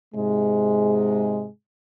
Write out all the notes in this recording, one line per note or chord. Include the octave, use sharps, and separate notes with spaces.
G#2 C3 G#3